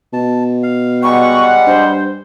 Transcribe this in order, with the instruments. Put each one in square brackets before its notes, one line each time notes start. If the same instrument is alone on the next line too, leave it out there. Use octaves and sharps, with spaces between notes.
[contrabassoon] B2 [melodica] A5
[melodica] F5
[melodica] G3 G#3 [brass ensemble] F#5 [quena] C#6
[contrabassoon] G2 [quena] C5